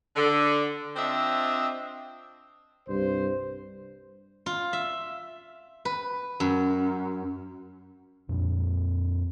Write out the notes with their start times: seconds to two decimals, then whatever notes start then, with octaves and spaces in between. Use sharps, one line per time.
0.16 D3
0.96 C4 D4 F4 D#5 E5
2.89 C2 G2 C5
4.46 F4
4.73 E5
5.85 B4
6.40 F#2
8.29 F2 A#2 G3 C4